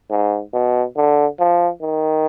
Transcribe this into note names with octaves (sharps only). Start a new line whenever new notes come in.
G#2
B2
D3
F3
D#3